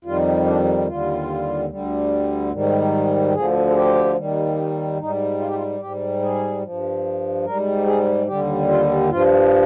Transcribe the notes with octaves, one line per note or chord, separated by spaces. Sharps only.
F2 D#3 G3 F4
D4
D#2 D3 G3 F4
D2 D3 G3
G#2 D#3 G3
D2 D3 F3 G#4
G#4
G4
D#2 D#3 G3
G#2 G3 D#4
F4
G4
F4
G#2 G3 G4
G#4
G2 F3
G#2 G3 A#4
G#4
D#2 D3 G3 G4
F4
G2 F3 F4